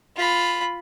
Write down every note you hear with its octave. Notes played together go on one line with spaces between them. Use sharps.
F4 B5